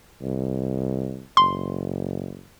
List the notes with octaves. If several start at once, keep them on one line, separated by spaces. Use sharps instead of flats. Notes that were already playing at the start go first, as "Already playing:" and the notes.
C2
F#1 C6